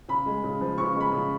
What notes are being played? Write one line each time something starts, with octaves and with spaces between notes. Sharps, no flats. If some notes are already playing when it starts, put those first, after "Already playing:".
C#3 B5
G#3
C#3
F3
C#3 C#6
G#3
B5
C#3